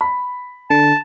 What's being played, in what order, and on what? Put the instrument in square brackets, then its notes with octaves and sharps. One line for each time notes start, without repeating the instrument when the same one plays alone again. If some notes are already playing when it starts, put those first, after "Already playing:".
[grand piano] B5
[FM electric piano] D3 [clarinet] A5